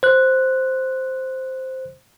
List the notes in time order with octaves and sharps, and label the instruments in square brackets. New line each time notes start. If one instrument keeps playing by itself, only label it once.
[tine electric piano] C5 F#6